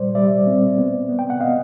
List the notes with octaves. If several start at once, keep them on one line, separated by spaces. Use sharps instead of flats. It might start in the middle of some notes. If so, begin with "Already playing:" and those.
Already playing: A#2 G3 C5 D5
G3 D5 E5
C4
B3
B3
G5
F#5
B3 D#5 F5